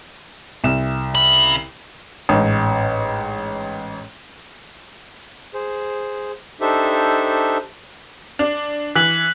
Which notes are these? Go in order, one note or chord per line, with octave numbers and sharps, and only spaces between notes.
C2 E7
C#3 B5
A1 G#2
G#4 C5
D4 D#4 G4 A4 C5 E5
D4
E3 F#6 B6 F#7